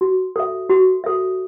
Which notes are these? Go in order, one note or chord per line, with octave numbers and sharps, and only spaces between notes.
F#4
A4 E5
F#4
A4 E5